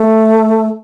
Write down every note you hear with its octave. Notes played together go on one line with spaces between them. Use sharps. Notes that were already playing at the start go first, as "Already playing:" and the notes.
Already playing: A3